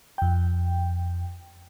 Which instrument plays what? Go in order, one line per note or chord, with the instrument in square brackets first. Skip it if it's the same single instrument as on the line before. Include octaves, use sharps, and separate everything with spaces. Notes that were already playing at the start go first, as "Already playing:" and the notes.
[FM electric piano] F2 G5